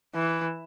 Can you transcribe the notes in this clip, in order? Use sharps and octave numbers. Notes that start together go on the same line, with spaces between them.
E3